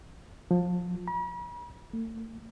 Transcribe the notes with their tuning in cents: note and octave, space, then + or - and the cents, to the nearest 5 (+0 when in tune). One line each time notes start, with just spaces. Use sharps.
F3 +25
B5 -45
A3 +40